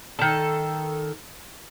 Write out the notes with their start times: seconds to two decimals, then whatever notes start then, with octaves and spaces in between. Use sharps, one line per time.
0.19 D#3 A4